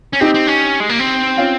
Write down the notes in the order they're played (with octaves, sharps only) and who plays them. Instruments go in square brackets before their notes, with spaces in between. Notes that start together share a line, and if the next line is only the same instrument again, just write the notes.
[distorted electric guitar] C#4
[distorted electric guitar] C4 [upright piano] D#4 G4
[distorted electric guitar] C4
C#4
G#3
A#3
C4
[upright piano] C#4 F4